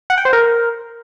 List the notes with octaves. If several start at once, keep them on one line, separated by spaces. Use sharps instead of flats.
F#5
G5
C5
A#4